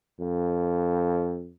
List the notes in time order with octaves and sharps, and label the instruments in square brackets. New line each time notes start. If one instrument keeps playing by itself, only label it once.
[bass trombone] F2